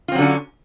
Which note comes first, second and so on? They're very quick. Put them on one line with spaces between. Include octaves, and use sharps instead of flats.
F4 C4 F#3 D3 C#4